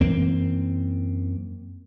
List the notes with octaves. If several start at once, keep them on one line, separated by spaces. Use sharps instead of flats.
F#2 E3 A#3 C4